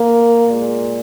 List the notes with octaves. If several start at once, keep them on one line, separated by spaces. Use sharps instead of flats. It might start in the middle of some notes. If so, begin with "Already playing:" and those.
Already playing: A#3
A#2 G#3